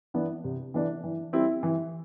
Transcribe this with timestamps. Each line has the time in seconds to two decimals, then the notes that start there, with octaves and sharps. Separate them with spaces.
0.14 E3 B3 D4
0.44 C3
0.74 E3 B3 D4
1.04 E3
1.33 G3 C4 E4
1.63 E3